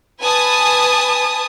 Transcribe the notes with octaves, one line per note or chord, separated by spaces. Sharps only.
B4 G#5 A5 D#6